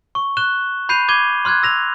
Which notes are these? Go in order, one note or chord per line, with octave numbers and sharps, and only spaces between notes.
C#6
F#6 E7 G7
B5 G6 C7 D#7 F7
D6 G#6 D#7 G7
C6 F6 F#6 G#6
E6 A#6 F7